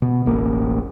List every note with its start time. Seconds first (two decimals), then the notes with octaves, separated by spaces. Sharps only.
0.02 B2
0.25 E1 A1 A#3